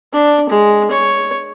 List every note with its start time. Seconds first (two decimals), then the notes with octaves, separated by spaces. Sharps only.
0.13 D4
0.50 G#3
0.91 C#5